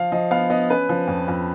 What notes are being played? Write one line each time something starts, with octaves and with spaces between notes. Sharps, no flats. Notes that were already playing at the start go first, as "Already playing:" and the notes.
Already playing: F3 F5
F3 D#5
B3 F5
B3 D#5
C#4 B4
F3
F2
F2